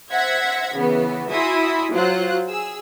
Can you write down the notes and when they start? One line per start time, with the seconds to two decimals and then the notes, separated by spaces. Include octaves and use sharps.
0.11 C5 E5 F#5 G#6 A#6 B6
0.74 C#3 E3 B3
1.30 E4 F#4 E5 G#5 C6 D#6
1.93 F#3 F4 C5 F#5 F#6
2.48 G#4 E6